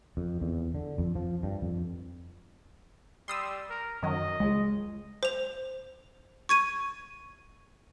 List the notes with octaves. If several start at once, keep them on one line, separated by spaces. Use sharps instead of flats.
F2
E2
D3
F2
F3
G2
F2
G3 C6 D#6 E6
A#4
F#2 D#3 F#3 D#5
C#2 G#3
C5 F7
C#6 G#6 D#7